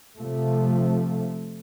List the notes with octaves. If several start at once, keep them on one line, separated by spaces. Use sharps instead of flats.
C3 F3 A3